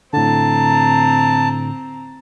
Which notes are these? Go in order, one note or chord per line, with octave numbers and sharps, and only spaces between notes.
A2 D3 C4 A5 A#5